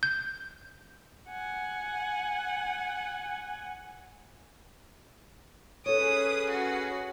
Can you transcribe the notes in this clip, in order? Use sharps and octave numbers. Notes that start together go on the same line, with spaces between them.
G6
F#5 G#5
C#4 G#4 A4 B4 C#5 D#6
F#4